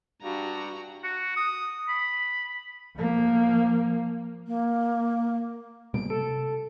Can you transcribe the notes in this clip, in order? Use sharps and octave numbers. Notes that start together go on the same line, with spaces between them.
G2 F#4 A#5
F#4
D#6
B5
F3 A#3
A#3
B2 G3 A#3 D7
C3 A4